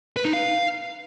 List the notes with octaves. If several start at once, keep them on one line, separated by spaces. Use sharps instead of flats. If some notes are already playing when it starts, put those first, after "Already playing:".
B4
D#4
F5